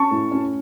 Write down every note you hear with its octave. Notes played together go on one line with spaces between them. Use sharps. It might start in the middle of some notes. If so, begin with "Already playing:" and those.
Already playing: C#4 A5 C#6
A2
C#4